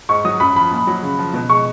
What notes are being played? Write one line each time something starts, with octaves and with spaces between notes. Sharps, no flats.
G#2 C#6
F#3 D#6
F#2 B5
F3 B5
A#2
F#3
C#3
F3
B2
G#3 C#6